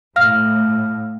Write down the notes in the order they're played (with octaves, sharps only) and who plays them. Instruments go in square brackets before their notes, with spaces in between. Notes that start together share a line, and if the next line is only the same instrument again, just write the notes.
[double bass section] A2 [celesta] F5 F6